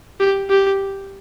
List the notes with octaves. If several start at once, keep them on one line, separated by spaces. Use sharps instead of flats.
G4
G4